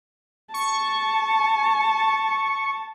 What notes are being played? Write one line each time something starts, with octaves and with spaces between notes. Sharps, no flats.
A5 C#6